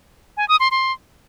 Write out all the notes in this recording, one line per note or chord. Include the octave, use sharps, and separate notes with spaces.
G#5
D#6
C6
C6